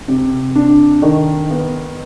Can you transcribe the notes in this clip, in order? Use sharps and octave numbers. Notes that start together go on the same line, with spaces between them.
C3
D4
D#3
B3